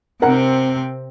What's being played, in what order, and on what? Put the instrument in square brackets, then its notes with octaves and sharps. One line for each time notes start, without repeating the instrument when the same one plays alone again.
[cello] C3 C4 [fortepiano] A#4 F#5 A#5